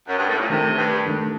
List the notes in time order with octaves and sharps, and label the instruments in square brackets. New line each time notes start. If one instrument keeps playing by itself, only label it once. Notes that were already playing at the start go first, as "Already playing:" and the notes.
[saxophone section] F#2
G2
A2
A#2
[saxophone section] C3 [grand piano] D#3 A3 D4 G4 A#4
[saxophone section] G2
[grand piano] D#3 A3 D4 G4 A#4